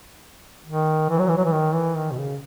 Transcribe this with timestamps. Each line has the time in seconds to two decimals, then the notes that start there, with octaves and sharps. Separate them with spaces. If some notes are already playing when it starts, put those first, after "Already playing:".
0.66 D#3
1.10 E3
1.19 F#3
1.28 E3
1.37 F#3
1.45 E3
1.53 D#3
1.74 E3
1.96 D#3
2.11 B2
2.18 C#3